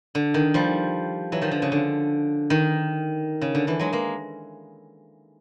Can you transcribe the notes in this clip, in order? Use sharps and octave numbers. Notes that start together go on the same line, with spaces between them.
D3
D#3
F3 G3
E3 F#3
D#3 F3
D3
C#3
D3
D#3
C#3
D3
D3 E3
F#3 G#3
G#3 A#3